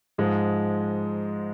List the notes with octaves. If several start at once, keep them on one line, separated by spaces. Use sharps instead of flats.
G#2 F3 G#3